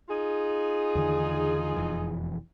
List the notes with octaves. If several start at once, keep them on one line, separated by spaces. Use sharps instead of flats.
D#4 F4 G#4
E2 D3 D#3
E1 F2 E3